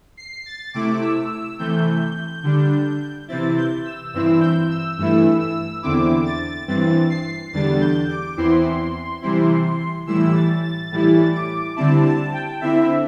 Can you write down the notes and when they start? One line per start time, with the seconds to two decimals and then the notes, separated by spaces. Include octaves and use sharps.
0.17 C7
0.46 A6
0.73 C3 A3 E4 D6
1.02 E6
1.30 E6
1.59 C3 E3 A3 G6
2.43 D3 G3 D4
3.28 C3 E3 C4 E4 A6
3.57 G6
3.85 E6
4.13 G2 E3 C4 E4 E6
4.41 G6
4.70 E6
4.98 G2 E3 A3 E4 E6
5.41 E6
5.82 E2 D3 C4 E4 D6
6.25 A6
6.68 G2 E3 C4 A6
7.09 C7
7.53 E2 D3 G3 D4 A6
7.81 G6
8.09 D6
8.37 E2 E3 C4 E4 C6
9.22 C3 E3 G3 C4 E4
10.07 A2 E3 G3 E4 E6
10.35 A6
10.64 A6
10.92 A2 E3 G3 E4 A6
11.34 D6
11.76 D3 G3 C4 E4 A5
12.05 A5
12.33 G5
12.61 D3 C4 E4 E5